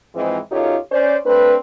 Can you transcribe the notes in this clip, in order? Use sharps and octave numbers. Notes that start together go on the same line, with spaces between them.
G#2 E3 F3 G#3 C4
F#2 D#4 F4 G4 A4 C#5
C#4 C5 D5
A3 C4 D4 B4